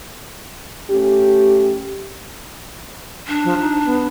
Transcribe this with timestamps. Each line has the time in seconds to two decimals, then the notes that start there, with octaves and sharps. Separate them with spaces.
0.90 A3 C#4 G4
3.28 D4
3.44 F3
3.61 D#4
3.86 B3